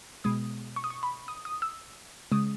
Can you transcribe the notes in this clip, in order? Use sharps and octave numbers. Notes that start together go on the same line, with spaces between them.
B2 G#3 D#6
C#6
D#6
C#6
B5
D#6
D#6
E6
C#3 G#3 D#6